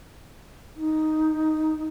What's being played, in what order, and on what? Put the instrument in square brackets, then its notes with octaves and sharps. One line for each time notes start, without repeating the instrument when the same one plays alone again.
[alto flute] D#4